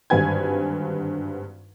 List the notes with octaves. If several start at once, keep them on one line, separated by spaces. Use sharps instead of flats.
G#1 G2 D3 B4 G#5 G#6